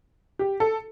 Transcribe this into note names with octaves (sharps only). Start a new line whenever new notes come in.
G4
A4